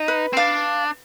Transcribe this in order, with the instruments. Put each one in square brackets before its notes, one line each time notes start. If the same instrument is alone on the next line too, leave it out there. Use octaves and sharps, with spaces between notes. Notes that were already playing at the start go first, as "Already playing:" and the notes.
Already playing: [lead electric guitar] D#4
[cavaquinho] B4
[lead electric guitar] C4
[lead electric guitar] D4 [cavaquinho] F5